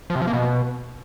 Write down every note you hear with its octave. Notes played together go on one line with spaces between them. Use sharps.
F3
C3
F3
A#3
B2